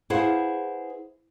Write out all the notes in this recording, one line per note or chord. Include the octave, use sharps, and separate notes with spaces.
E4 G#4 B4 C5 F5 F#5